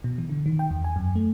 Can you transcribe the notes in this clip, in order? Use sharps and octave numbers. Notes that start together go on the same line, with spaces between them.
B2
E3
D3
D#3
G5
E2
G#5
F#2
A3